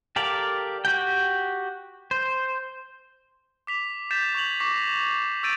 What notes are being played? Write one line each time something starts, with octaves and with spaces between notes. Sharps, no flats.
G4 A4 A#4 D5 F5
F#4 G4 G5
C5
D6 B6 F7
G6 A6 B6 E7
C#6 G#6 F7 F#7
C#6 D6 A#6 C7
C#6 E6 G6 A6 D7 D#7